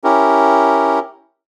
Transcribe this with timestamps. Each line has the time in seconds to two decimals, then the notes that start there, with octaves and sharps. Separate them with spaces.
0.04 C#4 E4 G4 A#4